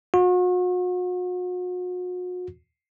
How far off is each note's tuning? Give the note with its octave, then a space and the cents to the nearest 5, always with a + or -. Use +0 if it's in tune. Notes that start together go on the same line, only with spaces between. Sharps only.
F#4 -40